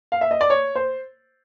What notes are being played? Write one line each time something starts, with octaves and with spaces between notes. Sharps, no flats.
F5
E5
D#5
D5
C#5
C5